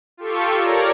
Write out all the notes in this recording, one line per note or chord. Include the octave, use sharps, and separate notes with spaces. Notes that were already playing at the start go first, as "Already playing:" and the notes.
F4 G4 A4 C#6
A#4 C#5 D5 A#5